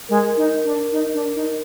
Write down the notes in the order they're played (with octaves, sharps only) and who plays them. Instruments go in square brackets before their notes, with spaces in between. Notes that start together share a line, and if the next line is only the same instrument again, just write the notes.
[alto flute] G#3 [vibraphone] A#4
[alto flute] D#4
D4
D#4
D4
D#4